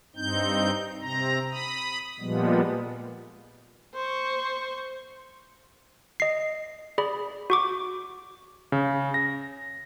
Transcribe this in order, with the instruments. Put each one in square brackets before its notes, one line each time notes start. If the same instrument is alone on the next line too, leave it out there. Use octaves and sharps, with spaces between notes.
[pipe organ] G2 C4 D#4 G6
C3 C4 A#5
B5 D#6
A#2 F3 G3 G#3 B3
[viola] C5 C#6
[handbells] D#5 C7
G#4 D5 B5
F#4 C#6 D6
[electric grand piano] C#3
A#6